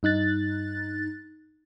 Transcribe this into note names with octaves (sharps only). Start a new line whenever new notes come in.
G2 D#4 F#6 A6